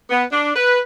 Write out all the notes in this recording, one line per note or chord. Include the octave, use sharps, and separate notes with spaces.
B3
D4
B4